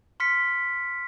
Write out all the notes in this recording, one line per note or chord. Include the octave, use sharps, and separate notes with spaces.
C6 F6 B6 C#7